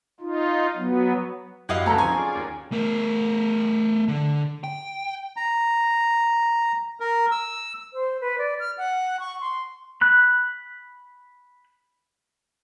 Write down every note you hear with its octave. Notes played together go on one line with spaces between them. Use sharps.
D#4 F4
F#3 B3
F#2 E4 G4 D#5 F5 F#5
C#2 C#4 A4 A#5
F3 C4 D#4 G#5 C#6
F4 G#4 D5
D#2
A3 A#4
D3
G5
A#5
A#4
E6
C5
B4
D5
F6
F#5
C#6
C6
B5 F#6